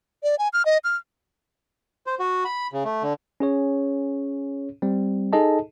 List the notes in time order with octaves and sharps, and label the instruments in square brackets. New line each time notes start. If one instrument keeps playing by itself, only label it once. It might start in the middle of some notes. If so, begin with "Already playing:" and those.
[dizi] D5
G#5
F6
D#5
F6
[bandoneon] C5
F#4
B5
C#3
A3
D3
[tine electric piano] C#4 G#4 C#5
G3 C4
D#4 G#4 A4 D#5 A5